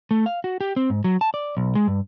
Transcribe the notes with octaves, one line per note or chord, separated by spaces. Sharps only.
A3
F5
F#4
G4
C4
G#2
F#3
A5
D5
B1
G#3
G2